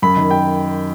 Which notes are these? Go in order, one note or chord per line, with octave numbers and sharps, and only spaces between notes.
F#2 B5
D#3
G5